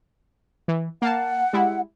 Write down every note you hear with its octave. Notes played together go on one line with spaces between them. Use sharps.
E3
A#3 F5 F#5 A5
G3 G#3 E4